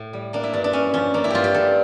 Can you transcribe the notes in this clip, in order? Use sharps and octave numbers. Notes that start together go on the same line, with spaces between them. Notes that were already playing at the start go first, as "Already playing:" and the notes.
Already playing: A2
G3
A#3 D4
E4
G2 D4
D4
G2 C#4
F3 C#4
A#3 D4
E4
G2 F4 G4
G4
G2 A4